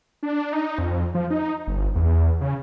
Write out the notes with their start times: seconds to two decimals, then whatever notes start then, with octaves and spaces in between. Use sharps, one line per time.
0.23 D4
0.53 D#4
0.78 F2
1.15 F3
1.31 D#4
1.67 G1
1.95 E2
2.41 C#3